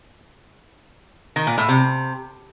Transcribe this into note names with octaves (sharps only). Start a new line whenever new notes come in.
D#3
A#2
A2
C3